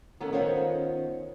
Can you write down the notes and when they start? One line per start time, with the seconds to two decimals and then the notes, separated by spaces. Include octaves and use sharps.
0.20 D#3 B3 C#4 A4
0.33 D#3 B3 C#4 F4 C5 C#5